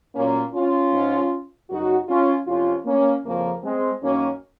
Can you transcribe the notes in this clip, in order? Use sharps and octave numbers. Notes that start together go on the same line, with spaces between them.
A#2 F#3 A#3 C#4
C#4 F4
G#2 F3
F#2 C#3 F#3 D#4 F#4
C#4 F4
F2 C3 F3 C#4 F4
A#3 C#4
F2 C#3 F3 A#3
G#3 C4
F#2 D#3 F#3 A#3 C#4